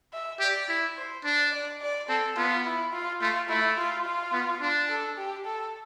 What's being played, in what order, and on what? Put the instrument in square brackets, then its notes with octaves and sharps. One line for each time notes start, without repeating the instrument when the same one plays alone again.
[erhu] E5
[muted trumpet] G4 [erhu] D5
[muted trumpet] E4
[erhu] C5
[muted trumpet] D4 [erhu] D5
[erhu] D5
D5
[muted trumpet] C4 [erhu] A4
[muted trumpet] B3 [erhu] F4
[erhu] E4
F4
[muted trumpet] A3 [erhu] F4
[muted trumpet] A3 [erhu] E4
[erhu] F4
F4
[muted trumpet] B3
D4
[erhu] A4
G4
A4